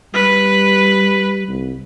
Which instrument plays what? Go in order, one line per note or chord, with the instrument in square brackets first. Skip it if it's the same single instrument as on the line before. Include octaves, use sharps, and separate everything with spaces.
[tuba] G3 [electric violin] B4
[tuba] C2